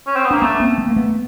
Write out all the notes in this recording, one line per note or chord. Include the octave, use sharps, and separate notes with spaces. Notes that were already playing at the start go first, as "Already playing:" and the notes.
C#4
C4
B3
A#3 D4
A3 B3 C#4
A#3 C4
A3 B3
A#3
A3 B3